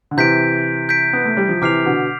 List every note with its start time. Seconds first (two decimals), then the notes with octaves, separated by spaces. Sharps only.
0.11 D3
0.17 C3 E3 G6 B6 D7
0.89 G6 B6 D7
1.13 B3
1.25 A3
1.37 G3
1.49 F3
1.62 C3 E3 D6 F6 C7 F7
1.86 B2 D3